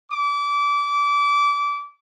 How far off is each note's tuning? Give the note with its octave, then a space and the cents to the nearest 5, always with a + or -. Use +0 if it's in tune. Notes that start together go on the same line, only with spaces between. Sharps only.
D6 -25